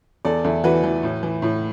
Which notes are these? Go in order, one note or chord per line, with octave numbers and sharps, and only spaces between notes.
E2 A4 D5
E2 E4 A4
E3 F#4 B4
E3
A2
E3
A2